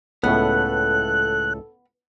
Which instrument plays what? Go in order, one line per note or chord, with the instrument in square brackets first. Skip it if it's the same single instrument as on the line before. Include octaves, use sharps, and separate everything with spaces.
[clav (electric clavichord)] C#2 A2 [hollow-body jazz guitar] B3 [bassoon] A4 [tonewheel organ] F#6